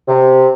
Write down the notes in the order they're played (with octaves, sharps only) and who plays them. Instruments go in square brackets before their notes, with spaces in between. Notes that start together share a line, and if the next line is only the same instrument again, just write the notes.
[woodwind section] C3